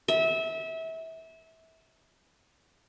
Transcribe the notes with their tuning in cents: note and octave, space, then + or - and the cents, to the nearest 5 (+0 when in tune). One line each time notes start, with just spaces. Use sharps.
E5 -25